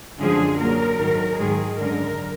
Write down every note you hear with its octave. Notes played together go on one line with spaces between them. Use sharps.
F#2 D3 F3 G#3 G#4
A#2 F#3 A#4
G#2 D#3 F#3
G#2 D#3 G#3 G#4
F#2 D3 G#3 A#4